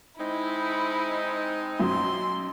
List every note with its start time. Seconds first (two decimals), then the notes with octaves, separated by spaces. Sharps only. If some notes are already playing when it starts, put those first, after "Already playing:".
0.19 G#3 C4 D#4 E4
1.80 B1 F#2 F#3 C6